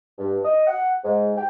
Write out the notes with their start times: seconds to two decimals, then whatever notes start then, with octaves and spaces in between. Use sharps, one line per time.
0.18 G2
0.44 D#5
0.67 F#5
1.04 G#2
1.36 G5